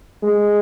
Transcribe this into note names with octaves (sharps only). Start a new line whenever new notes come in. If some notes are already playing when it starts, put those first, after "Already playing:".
G#3